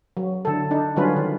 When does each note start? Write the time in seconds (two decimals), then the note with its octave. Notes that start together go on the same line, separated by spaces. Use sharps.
0.17 F#3
0.45 D3 A4
0.71 D4 D#4
0.96 D3 F#3 G3 C#4 F4 B4
1.16 D#3